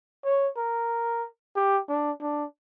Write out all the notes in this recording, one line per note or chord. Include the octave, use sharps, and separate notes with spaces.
C#5
A#4
G4
D4
D4